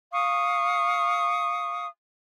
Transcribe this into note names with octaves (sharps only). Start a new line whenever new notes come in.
F5 C#6 D#6